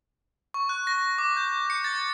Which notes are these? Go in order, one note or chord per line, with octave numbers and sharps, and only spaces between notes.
C#6
F#6
A#6
D6
G6
C#7
A6